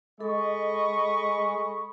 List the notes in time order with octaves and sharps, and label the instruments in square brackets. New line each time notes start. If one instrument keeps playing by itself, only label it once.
[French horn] G#3 [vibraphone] A4 [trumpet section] D#5 B5 C#6